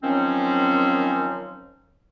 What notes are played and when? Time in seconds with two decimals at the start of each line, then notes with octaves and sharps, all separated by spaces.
0.03 D#3 F3 F#3 C4 C#4